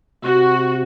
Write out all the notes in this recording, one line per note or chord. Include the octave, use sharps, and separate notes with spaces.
C3 F#4